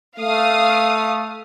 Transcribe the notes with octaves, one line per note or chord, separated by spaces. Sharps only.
A3 F5 D#6